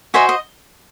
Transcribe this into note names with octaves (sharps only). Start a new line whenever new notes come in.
F#4 C5 D#5 E5 G#5
D#5